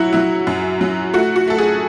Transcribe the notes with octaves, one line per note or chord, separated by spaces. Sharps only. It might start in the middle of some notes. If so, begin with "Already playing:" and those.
Already playing: F#3 E4 F#4
F#3 E4
F#2
F#3
A3 F#4
F#4
A3 A4
G#4